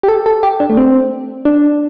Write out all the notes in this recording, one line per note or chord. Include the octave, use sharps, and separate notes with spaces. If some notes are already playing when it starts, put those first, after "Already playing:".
G4
A4
A4
G4
D4
A3
C4
D4